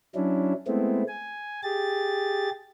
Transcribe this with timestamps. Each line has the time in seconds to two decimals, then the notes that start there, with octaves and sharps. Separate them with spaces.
0.15 F#3 C#4 D4 E4
0.67 G#3 A3 B3 C4 E4
1.08 G#5
1.63 G4 G#4 A6